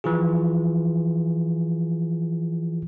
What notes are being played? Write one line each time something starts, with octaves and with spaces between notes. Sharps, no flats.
E3 F3 F4 G#4